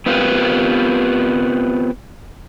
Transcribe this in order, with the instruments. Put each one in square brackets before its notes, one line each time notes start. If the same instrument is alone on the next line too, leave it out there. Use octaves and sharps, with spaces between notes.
[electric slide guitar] B3 C4 F4 G4 A#4 B4